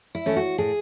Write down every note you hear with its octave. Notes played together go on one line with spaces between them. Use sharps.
E4
E3 A3 C#4
F#4
A2 G#4